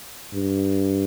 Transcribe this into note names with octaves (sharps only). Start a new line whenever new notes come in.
G2